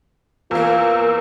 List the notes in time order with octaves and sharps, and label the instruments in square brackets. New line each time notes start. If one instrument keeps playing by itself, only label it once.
[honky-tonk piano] E2 A#3 [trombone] F4 [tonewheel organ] A#4 E6